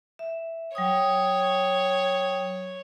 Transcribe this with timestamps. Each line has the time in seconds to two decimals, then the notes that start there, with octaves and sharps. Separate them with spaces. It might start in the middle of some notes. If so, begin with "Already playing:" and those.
0.19 E5
0.75 F#3 C#5 G5 D#6